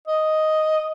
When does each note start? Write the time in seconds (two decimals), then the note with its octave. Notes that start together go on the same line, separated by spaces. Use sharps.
0.07 D#5